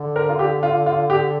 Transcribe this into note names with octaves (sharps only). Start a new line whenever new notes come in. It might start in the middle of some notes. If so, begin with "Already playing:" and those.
Already playing: D3
A#4
F4
G4
F4
F4
G4